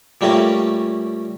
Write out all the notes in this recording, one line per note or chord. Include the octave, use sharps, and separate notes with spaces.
A#2 G3 A3 A#3 C4 C#4